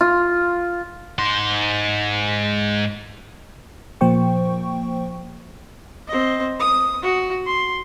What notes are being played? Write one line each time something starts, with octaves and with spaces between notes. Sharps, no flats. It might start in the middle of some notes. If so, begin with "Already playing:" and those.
F4
G#2 C6
A#2 F3 A#3 C5 G5 C#6
C4 D#5
D#6
F#4
C6